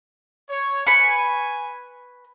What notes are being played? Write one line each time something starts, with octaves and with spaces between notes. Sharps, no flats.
C#5
B4 G#5 B5 C#6